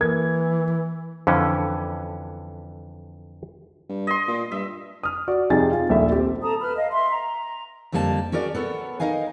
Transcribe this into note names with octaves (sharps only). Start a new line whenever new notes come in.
E3 A#3 G#6
F2 D3 E3 C#4
G2
D#5 C6
A#2
G2 E5
D#6 F6
F#4 D5
F2 C3 D#4 G#4 G#5 A6
F4
D#1 A#1 D#2 A3 E5
C4 G4
A4 A5 A#5 D#6
B4 B5 F6
D#5 F5
E5 C6
A#5
F2 D3 G3 A#3 F#4 A5
C#4 F#4 G#4 A#4 D5
B3 A4 A#4 C#5
D#4 A#4 D#5 F5 G#5